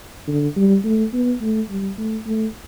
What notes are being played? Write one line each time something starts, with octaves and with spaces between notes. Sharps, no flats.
D3
G3
A3
B3
A3
G3
A3
A3